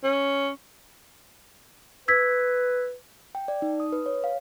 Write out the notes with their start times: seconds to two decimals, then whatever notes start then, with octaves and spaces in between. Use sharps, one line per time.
0.04 C#4
2.08 B4 E6 G#6 B6
3.35 G5
3.48 D5
3.62 D#4
3.80 D#6
3.92 B4
4.06 C#5
4.24 F5